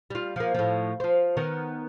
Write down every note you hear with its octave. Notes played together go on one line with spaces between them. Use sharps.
G3 F4
F3 A#3
A2 F3
F3 C5
D#3 B3 A#4